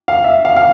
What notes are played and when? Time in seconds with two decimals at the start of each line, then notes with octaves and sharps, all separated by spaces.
0.08 F5
0.24 E5
0.45 F5
0.56 F5